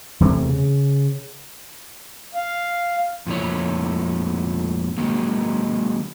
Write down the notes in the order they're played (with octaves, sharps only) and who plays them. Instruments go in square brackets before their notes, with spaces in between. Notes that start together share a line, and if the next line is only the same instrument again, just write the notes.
[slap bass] E2 C3 E3 A3
C#3
[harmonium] F5
[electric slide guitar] F2 A#2 A3 E4 C#5
D#3 F#3 G#3 A#3